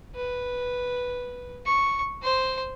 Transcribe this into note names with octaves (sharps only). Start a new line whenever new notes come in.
B4
C#6
C5 C6